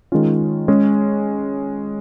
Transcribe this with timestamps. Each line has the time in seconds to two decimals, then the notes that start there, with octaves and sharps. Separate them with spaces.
0.12 D#3 G#3 C#4 F4
0.68 G#3 C#4 G#4